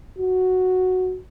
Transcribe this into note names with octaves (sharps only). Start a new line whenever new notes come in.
F#4